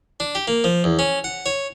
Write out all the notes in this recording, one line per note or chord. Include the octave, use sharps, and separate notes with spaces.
D4
G4
A#3
F3
E2
C#4
F#5
C#5